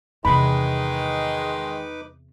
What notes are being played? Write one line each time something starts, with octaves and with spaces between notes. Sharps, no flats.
E2 C3 D#3 G#3 D#4 B4 B5 D6